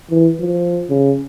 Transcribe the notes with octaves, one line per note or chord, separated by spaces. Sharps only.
E3
F3
C#3